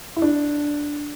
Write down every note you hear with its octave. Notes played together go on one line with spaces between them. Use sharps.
E4
D4